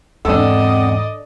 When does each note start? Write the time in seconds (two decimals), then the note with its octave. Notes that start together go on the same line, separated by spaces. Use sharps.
0.25 E2 G#2 C4 D4 A4 D5 D#5 F#5